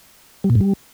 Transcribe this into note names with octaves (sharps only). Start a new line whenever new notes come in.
G3
A#2
G#2
G3